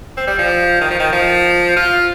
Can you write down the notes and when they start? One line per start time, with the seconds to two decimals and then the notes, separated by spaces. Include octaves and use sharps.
0.17 C4
0.27 G3
0.39 F3
0.81 D#3
0.90 F3
0.99 D#3
1.12 F3
1.76 F4